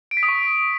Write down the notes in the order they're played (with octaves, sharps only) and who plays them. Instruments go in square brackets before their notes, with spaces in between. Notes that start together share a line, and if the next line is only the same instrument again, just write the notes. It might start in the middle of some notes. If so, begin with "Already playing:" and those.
[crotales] D7
B6
D#6
C#6